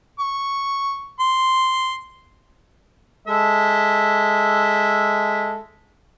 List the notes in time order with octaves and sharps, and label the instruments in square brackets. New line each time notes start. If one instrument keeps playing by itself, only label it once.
[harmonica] C#6
C6
G#3 A4 E5